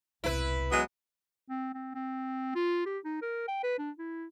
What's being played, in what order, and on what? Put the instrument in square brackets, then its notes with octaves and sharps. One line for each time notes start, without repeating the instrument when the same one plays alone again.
[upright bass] E1 C2 [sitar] E4 B4
[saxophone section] F#3 G#3 B3
[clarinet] C4
C4
C4
F4
G4
D#4
A#4
G5
B4
D4
E4